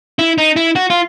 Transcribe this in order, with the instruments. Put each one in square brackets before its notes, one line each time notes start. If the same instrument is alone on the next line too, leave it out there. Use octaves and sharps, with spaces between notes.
[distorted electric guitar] E4
D#4
E4
F#4
F4